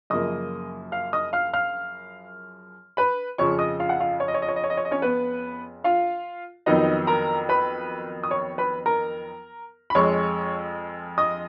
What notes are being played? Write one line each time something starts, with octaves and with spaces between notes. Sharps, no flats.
F#2 C#3 F3 A#3 D#5 D#6
F5 F6
D#5 D#6
F5 F6
F5 F6
B4 B5
F2 C#3 F3 C#5 C#6
D#5 D#6
F4 F5
F#5
F4 F5
C#5
D#5
C#5
D#5
C#5
D#5
C#5
D#5
C#5
D#5
C#4 C#5
B3 B4
F4 F5
F2 D#3 F#3 B3 D#4 D#5
A#4 A#5
B4 B5
D#6
C#5 C#6
B4 B5
A#4 A#5
B5
F2 F3 G#3 C#5 C#6
D#5 D#6